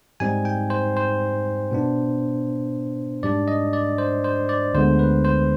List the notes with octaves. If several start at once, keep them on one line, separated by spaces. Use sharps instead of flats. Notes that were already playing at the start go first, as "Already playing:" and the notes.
G#2 G3 C4 D#4 G#5
G5
C5
C5
B2 B3 D4
G#2 G3 D4 D5
D#5
D5
C5
C5
D5
D2 D3 G#3 B3 C5
B4
C5